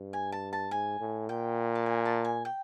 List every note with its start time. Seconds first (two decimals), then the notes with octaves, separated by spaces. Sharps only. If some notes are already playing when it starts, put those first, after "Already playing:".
Already playing: G2
0.13 G#5
0.32 A5
0.53 A5
0.71 G#2 G#5
1.00 A2
1.29 A#2 G5
1.75 A5
1.86 G#5
2.06 A5
2.25 G#5
2.45 G5